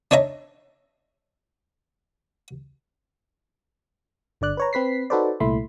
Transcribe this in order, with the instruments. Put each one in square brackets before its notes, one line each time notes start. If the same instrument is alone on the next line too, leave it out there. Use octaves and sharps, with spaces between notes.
[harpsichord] D4 D#4 C#5 E5 A#5
[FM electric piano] G1 D3 D5 F#6
B4 C#5 A#5
C4 B4 B6 C7
D#4 F#4 A4 B4 C5 D5
C2 A#2 A3 E4 B5 C6